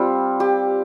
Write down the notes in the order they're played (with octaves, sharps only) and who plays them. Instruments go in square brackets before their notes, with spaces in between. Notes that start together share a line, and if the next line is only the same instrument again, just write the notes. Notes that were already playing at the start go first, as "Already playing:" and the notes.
Already playing: [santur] G3 C4 F4
G4